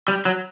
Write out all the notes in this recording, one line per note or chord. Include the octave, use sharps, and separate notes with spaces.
G3
F#3